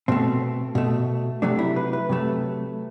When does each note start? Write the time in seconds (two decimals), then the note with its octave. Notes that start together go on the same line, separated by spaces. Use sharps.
0.08 B2 A3 C4
0.75 B2 A3
1.42 C3 F#3 A3 D4
1.59 E4
1.76 B4
1.93 B4
2.09 C3 F#3 A3